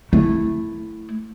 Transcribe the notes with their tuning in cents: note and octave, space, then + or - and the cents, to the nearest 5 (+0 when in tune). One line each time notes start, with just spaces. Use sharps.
A3 +0 E4 +0